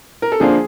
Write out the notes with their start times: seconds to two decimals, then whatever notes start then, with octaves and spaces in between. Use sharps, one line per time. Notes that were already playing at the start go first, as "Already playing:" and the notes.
0.22 A#4
0.32 A4
0.40 D3 F3 A#3 D4 F4 G#4